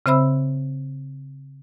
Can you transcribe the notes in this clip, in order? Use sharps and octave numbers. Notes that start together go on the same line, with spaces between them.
C#3 C4 C5 E5 B5 E6